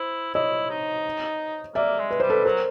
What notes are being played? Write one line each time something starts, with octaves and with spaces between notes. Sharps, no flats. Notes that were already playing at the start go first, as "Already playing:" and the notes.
Already playing: E4 C5
E4 C#5 D#5
D#4
A#3 D5 E5
G#3
B4
G3 C5
A4 B4
F#3 A#4 C5